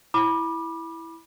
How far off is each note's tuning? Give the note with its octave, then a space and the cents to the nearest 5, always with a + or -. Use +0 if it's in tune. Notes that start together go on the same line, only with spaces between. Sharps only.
E4 +0 B5 -20 D6 +20